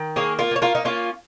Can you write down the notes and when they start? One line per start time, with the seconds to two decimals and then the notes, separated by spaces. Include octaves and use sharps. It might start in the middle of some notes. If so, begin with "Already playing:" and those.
Already playing: D#3
0.16 A#3 G#4 C#5
0.39 F4 A#4
0.51 A#3 C#5
0.62 F4 A#4
0.75 D#4
0.85 A#3 C#4 F4